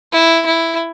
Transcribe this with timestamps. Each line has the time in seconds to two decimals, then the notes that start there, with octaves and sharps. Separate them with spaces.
0.13 E4
0.46 E4